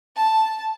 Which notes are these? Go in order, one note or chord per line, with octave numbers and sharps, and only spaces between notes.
A5